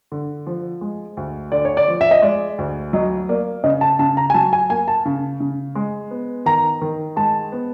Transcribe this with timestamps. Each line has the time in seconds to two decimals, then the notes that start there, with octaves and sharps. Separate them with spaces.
0.12 D3
0.47 F3
0.81 G#3
1.17 D2
1.52 D3 D5
1.65 C#5
1.77 D5
1.88 F3
2.01 E5
2.11 D#5
2.22 G#3 D5
2.58 D2
2.93 F#3 D#5
3.29 A#3 D5
3.64 C#3 D#5
3.81 A5
3.99 C#3 A5
4.17 A#5
4.30 G#5
4.34 F#3 A5
4.53 G#5
4.70 A#3 G#5
4.88 A5
5.05 C#3
5.40 C#3
5.75 G#3
6.11 B3
6.46 D#3 A#5
6.81 D#3
7.16 G#3 A5
7.52 B3